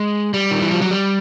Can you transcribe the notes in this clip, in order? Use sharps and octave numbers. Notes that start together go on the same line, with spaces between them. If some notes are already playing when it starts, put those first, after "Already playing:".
Already playing: G#3
G3
D#3
E3
F3
F#3
G3